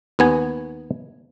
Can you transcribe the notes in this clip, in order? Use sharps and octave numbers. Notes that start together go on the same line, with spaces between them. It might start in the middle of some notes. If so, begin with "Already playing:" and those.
D#2 B3 G#5